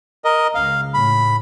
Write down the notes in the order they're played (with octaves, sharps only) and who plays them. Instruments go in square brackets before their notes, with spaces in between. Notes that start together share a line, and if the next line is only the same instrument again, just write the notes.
[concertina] A#4 D#5
[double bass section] C#2 [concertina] F5
[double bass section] A2 [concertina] B5